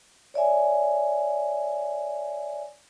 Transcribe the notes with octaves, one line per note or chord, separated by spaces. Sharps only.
C#5 D5 E5 G#5